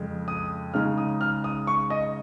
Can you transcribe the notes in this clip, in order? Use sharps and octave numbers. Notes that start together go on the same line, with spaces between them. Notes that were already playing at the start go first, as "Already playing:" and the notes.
Already playing: F2 C#3 G#3
D#6
C#3 G#3 D#4 F6
D#6
F6
D#6
C#6
D#5